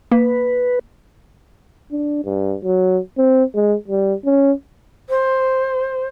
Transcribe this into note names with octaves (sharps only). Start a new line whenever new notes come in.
A#3 B4
D4
G2
F#3
C4
G#3
G3
C#4
C5